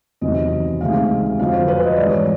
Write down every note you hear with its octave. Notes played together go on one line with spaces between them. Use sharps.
E2 C3 D#3 F#3 D#5
D2 C3 D#3 G#3 F5
F2 D3 F#3 F5
C5
B4
D#5
G#2 E3 G3 D5
C#5